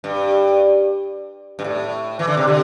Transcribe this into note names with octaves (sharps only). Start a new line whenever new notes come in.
G2
G2
A2
E3
D3
C3
D3